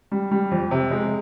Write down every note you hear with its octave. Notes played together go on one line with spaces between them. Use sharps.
G3
G3
F2
C3
G#3